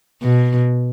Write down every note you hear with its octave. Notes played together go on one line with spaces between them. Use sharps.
B2